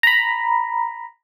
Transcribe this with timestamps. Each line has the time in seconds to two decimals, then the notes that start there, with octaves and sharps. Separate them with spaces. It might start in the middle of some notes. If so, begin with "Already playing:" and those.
0.03 A#5 B5